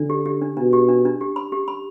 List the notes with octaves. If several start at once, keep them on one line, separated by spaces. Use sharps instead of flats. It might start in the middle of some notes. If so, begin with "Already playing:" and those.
Already playing: D3 D4
G4
G4
D4
B2 D4
G4
D4
D4
G4
B5
G4
B5